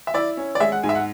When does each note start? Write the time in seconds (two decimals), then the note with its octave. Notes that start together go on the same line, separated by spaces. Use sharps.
0.07 E5
0.14 E4 D5
0.37 C#4
0.55 D5
0.60 G#3 E5
0.72 F#5
0.83 G#2 G#5
0.89 E5
0.95 F#5